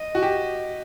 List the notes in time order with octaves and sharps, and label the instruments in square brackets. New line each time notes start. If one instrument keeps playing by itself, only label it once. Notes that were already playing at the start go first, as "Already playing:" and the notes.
Already playing: [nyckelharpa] D#5
[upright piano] F#4
G4